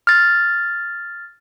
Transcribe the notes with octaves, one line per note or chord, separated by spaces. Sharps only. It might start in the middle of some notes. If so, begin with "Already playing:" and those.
F6 A6